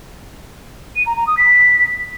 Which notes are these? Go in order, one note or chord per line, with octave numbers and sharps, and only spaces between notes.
D#7
A#5
A#5
D#6
B6